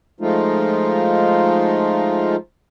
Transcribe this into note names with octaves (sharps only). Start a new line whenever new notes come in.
F3 G#3 A3 D#4 F4